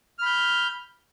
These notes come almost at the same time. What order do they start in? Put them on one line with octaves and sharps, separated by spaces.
F6 B5 G6